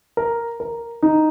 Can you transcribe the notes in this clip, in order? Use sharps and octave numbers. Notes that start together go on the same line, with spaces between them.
A#4
A#4
D#4